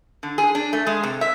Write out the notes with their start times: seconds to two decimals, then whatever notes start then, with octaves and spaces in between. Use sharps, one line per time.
0.23 D3
0.38 G#4
0.55 D4
0.73 A3
0.87 G#3
1.03 C3
1.21 E5